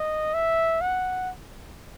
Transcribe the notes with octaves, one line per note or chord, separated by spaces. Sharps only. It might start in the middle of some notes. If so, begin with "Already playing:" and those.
Already playing: D#5
E5
F#5